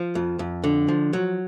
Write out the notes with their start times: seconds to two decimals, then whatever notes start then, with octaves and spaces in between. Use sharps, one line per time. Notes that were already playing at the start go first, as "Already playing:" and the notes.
Already playing: F3
0.15 F2
0.39 F2
0.64 D3
0.88 F3
1.13 F#3